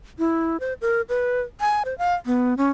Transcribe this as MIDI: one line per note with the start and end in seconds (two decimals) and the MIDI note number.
0.19 0.60 64
0.60 0.73 72
0.81 1.01 70
1.09 1.41 71
1.61 1.83 80
1.85 1.97 72
1.98 2.15 77
2.26 2.54 59
2.57 2.70 61